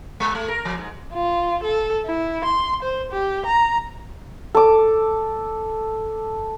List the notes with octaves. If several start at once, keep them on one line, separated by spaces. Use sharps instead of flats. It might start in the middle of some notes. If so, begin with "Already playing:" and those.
G#3
A3
A#4
F3
G#2
F4
A4
E4
C6
C5
G4
A#5
A4 D6